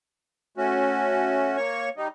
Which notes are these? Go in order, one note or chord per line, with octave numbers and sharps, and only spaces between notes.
A3 C#4 F#4
A#3 C#5 C#6
G3 D#4